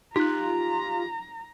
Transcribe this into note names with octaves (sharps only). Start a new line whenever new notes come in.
D#4 F4 G4 A#5 F#6